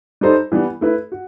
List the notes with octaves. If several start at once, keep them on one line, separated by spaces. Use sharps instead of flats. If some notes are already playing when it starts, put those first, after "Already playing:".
G3 D#4 A4 C5
E3 G3 B3
A3 E4 B4
F#4